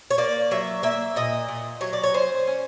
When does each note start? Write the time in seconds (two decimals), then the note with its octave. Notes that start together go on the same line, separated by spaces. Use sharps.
0.11 C#5
0.18 A#3 D5
0.51 F#3 E5
0.83 A#3 E5
1.16 A#2 D#5
1.48 A#2
1.81 F#3 C#5
1.93 D5
2.04 C#5
2.14 C#4 C5
2.47 C#4